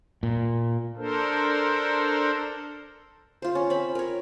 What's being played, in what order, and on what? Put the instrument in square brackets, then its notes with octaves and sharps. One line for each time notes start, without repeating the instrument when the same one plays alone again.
[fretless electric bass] A#2
[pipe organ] D4 A4 A#4 C5
[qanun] F4 C5
C#4
C4 B5
A#4 C#5